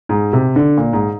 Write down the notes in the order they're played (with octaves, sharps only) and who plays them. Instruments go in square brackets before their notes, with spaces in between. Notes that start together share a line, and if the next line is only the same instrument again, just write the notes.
[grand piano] G#2
C3
D3
A#2
G#2